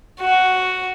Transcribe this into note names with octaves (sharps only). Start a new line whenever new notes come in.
F#4